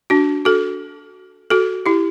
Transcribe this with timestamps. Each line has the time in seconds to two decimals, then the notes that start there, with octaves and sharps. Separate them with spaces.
0.10 D4 F#4
0.45 F#4 A4
1.50 F#4 A4
1.86 E4 G4